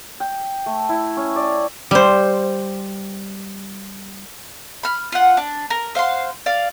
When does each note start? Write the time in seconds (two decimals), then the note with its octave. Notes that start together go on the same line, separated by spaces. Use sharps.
0.20 G5
0.66 A3
0.89 E4
1.17 C#4
1.36 D5
1.91 G3 C5
4.83 B5 F6
5.12 F4 F#5
5.37 D4
5.70 A#4
5.95 C5 F5 F#5 C6
6.46 D5 F5